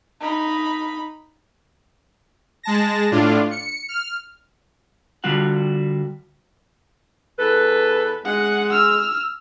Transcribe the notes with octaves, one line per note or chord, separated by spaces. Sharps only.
D#4 B5
G#3 A5 A#6
A2 D4 F4
C#7
F6
D3 G3 F4 F#4 F#5
E2 A4 B4
G#3 F#5
E6 F6